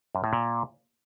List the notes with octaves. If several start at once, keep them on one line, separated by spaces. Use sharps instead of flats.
F#2
A2
A#2